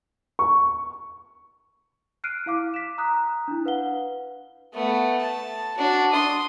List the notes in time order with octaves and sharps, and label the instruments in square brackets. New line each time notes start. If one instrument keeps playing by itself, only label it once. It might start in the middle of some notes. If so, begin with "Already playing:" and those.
[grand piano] C#6
[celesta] F6 F#6 C7 D7 D#7
E4 F5 D6
B6 E7
A#5 D#6 F#6
D4 E4
B4 F5 F#5 G7
[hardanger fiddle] A3 B3
A5
D4 F#4
C6 D#6